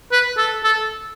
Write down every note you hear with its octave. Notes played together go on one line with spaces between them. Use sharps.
B4
A4
A4